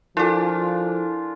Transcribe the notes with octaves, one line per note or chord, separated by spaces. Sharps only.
F3 D4 E4 F4 A4 A#4 G#5